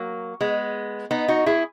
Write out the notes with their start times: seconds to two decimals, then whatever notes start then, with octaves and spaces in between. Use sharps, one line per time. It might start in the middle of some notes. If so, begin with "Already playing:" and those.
Already playing: F#3 A#3
0.41 G#3 B3
1.11 B3 D#4
1.28 D#4 F#4
1.46 E4 G#4